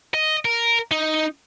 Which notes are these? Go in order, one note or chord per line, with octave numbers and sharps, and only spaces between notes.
D#5
A#4
D#4